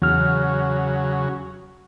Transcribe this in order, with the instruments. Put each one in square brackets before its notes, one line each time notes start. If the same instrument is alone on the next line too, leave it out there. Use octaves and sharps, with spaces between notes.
[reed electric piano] E2 F6 [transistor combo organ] C#3 F#3